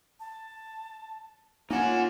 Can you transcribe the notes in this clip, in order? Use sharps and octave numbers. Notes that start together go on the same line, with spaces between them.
A5
A#3 C#4 D#4 F4 F#5 G#5